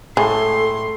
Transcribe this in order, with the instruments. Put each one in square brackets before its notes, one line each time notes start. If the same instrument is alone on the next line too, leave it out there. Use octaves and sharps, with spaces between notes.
[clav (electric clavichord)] A2 [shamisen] G#3 [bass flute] A4 [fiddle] C6